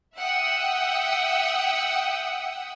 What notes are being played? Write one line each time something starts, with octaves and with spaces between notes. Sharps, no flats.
E5 F#5 G5 D#6 E6